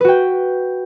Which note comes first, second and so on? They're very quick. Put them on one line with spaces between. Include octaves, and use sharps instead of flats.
B4 F#4 G5